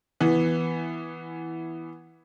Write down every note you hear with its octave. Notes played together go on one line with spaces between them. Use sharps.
E3 B3